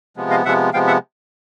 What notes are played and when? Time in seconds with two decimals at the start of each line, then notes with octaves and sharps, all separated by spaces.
0.16 C3 F3 G#3 B3
0.31 D#5 F5
0.45 C3 F3 G#3 B3 E5 F#5
0.73 C3 F3 G#3 B3 F5 G5
0.87 E5 F#5